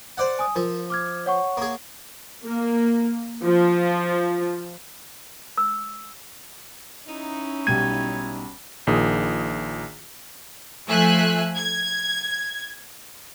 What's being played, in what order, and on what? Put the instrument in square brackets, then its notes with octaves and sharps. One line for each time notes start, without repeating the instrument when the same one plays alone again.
[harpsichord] C5 D5 F#5
[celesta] G#5 D#6
[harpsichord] F3 [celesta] A#4
[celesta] D6 F6 G#6
C#5 F#5 C#6
[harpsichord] A#3 G#4
[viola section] A#3
F3
[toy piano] E6
[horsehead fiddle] C#4 [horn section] D#4 E4
[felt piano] B1 G3 D#7 [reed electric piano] G#6
[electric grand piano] A#1 A#2 D#3 G#4 D#6
[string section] F3 A3 E5 G#5 F#6
G#6